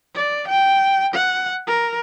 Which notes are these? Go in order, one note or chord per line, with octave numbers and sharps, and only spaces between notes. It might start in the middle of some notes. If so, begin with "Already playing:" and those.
D5
G5
F#5
A#4